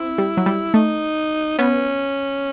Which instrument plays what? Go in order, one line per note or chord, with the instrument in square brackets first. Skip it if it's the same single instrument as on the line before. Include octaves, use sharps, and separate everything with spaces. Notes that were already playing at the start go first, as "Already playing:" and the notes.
Already playing: [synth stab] C4 [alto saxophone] E4
[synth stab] G3
F#3
G3
[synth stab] A3 [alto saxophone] D#4
[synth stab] B3 [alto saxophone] C#4